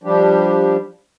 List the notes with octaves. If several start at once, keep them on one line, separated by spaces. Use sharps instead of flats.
F3 G3 D4 G4